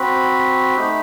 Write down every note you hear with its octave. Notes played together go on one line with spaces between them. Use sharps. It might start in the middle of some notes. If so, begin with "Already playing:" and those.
Already playing: C4 F#4 B5
A3 D#4 G4